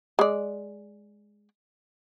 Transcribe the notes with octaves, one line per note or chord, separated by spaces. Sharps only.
G#3 D5